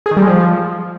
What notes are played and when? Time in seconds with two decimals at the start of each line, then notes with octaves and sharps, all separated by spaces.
0.06 G#4
0.11 D#3
0.17 G3
0.22 G#3
0.27 F3